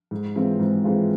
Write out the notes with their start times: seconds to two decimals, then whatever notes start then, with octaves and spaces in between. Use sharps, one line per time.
0.11 G#2
0.36 E3 G#3 C4 F4
0.59 G#2
0.84 E3 G#3 C4 F4